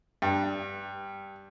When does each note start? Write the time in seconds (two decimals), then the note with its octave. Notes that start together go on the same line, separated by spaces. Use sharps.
0.22 G2